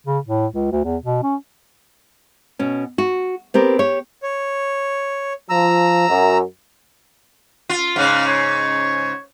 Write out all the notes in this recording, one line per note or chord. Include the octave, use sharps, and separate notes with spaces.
C#3
A2
C#2
D2
E2
B2
C#4
B2 C#4
F#4
B3 C4 G4 A#4
G4 C#5
C#5
F3 A#5 E6
F#2
F4
G#2 C#3 F5
C#5